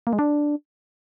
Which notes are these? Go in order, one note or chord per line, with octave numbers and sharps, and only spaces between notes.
A#3
G#3
D4